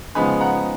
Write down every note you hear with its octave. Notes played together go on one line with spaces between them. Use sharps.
C#3 F3 G#3 B3 D#4 G#5 B5
F#5 A#5